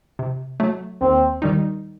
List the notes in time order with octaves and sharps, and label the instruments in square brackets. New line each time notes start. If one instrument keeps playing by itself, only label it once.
[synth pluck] C3
F#3 A3
[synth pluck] D#2 [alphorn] C4
[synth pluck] D#3 G3 D#4